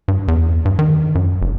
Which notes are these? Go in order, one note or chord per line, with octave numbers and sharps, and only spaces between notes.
G2
E2
G2
D#3
F#2
F1